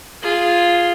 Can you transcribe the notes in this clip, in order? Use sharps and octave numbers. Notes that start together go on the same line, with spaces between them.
F4 G#4